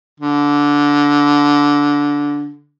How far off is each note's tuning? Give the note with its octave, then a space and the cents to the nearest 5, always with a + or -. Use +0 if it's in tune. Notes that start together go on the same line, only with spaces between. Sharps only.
D3 -15